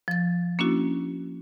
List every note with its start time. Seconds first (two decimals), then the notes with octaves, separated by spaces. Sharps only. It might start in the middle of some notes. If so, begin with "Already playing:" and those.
0.08 F3 A6
0.59 A#3 C#4 D4 E4 F#4